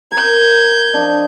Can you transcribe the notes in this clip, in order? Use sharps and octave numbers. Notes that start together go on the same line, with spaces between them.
A#4 G6 G#6
F3 D4 D#5